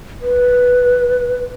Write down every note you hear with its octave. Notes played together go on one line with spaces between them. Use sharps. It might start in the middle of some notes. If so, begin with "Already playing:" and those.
B4